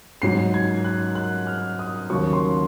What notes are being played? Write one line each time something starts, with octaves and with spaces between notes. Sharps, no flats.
G#2 F#3 C7
G#6
F#6
F#6
F6
D#6
D#2 C#3 F#3 C#6
C6